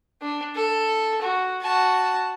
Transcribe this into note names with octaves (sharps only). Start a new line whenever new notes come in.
D4
A4
F#4
F#4 A5